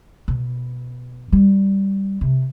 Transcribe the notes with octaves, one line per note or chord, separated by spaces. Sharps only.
B2
G3
C3